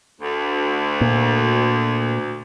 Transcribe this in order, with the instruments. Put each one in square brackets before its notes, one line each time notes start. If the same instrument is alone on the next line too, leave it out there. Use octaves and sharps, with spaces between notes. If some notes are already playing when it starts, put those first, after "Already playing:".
[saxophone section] D2
[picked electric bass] A#2